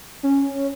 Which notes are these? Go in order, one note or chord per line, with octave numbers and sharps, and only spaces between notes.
C#4